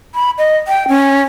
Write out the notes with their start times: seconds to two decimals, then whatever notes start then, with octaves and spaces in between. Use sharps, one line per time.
0.15 B5
0.38 D#5
0.68 G5
0.88 C#4